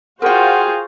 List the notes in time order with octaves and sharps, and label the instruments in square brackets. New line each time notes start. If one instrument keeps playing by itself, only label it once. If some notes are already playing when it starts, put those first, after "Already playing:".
[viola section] F4 F#4 C5 [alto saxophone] G#4 [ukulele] A#4 G5 [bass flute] F#5